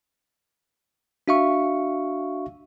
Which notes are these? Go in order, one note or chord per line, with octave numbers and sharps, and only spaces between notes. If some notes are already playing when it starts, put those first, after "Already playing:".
D4 F#4 E5 F5 C#6